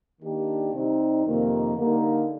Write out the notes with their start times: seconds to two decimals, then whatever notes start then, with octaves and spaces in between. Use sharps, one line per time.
0.21 D#3 A#3 D4 G4
0.72 C3 G3 C4 D#4
1.24 F2 C3 D#3 A#3
1.75 D3 G3 A#3 D#4